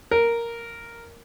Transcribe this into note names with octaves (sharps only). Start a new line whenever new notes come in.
A#4